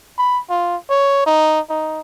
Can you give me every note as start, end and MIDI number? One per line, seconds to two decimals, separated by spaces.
0.18 0.39 83
0.50 0.76 65
0.90 1.26 73
1.26 1.60 63
1.70 2.00 63